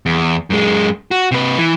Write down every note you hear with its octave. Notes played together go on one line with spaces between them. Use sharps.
E2
F#2 G#3
F#4
C3 B4
E3